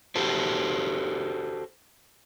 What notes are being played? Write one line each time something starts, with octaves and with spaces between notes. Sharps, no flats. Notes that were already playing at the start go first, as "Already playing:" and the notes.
F#4 G4 A4 C5